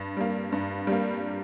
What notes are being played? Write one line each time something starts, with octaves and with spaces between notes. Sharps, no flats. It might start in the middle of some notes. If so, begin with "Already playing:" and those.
Already playing: G2
G3 A#3
G2
G3 A#3